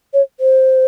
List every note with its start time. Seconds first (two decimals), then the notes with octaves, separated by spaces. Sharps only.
0.13 C#5
0.40 C5